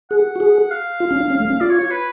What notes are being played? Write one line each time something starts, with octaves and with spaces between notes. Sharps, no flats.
G#4 F#5
F#4
G#4
F5
F4
C#4
D4
C#4
A3
C#4
F4 D5
C#5
C#5
B4